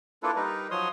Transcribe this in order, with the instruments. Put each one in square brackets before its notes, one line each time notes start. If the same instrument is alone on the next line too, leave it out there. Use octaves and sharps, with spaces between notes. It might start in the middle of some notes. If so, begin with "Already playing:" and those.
[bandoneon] A#3 D4 E4 F4 A4 B4
G3 D#4 A#4 B4
F3 F#3 C#5 C6 D#6